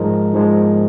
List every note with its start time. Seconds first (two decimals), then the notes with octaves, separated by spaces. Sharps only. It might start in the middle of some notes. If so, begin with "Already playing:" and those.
Already playing: G#2 F3 G#3 A#4
0.33 G#2 F3 G#3